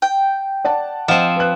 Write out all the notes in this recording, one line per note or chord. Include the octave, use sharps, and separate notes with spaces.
G5
D5 F#5 A5
F3 C4 D#5 F#5
B4 F#6